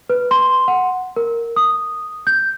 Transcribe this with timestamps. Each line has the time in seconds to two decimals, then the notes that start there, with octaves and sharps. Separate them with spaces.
0.10 B4
0.31 C6
0.68 F#5
1.16 A#4
1.56 D#6
2.27 G6